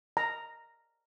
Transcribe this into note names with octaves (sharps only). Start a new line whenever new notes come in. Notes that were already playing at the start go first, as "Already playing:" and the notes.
A#5